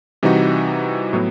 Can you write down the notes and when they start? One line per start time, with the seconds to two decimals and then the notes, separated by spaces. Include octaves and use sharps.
0.23 C3 E3 G3 D#4 F#4
1.13 A2 F#3 B3